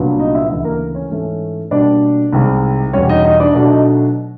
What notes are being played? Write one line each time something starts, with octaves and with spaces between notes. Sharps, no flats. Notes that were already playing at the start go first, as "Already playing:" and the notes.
Already playing: C2 A#2 F#3 B3 D4
D#4 D#5
E4 E5
D2 C#3 E3 E4 E5
A#3 A#4
C#4 C#5
G#2 E3 A3 C#4
B2 G3 A#3 D4 D5
C2 C3 D#3 G#3
E2 B2 G3 C#4 C#5
D#4 D#5
D#4 D#5
D4 D5
B2 F#3 A3 D4 D5
D#4 D#5